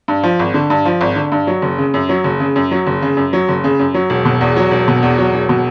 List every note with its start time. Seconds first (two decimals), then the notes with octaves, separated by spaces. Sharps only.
0.08 G2
0.23 F3
0.39 G#1
0.54 D3
0.70 G2
0.85 F3
1.01 G#1
1.16 D3
1.32 G2
1.47 F#3
1.62 F#1
1.78 C#3
1.94 F#2
2.09 F#3
2.24 F#1
2.40 C#3
2.56 F#2
2.71 F#3
2.87 F#1
3.02 C#3
3.17 F#2
3.33 F#3
3.48 F#1
3.64 C#3
3.79 F#2
3.94 F#3
4.10 E1
4.25 B2
4.41 E2
4.56 F#3
4.71 E1
4.88 B2
5.03 E2
5.18 F#3
5.33 E1
5.49 B2